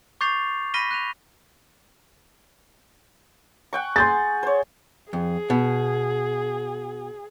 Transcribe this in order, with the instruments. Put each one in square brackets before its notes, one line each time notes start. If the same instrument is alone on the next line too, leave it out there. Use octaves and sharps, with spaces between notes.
[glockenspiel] C#6 D6 G6 A6 C7 F7
B5 F6 A#6 B6 D#7 G7
F#6 D#7 F7
[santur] F#5 G5 C#6
[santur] G#4 G#5 [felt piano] C6 G6 A6
[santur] C5 C#5
[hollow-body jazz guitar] F2 [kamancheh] G#4
[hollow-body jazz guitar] B2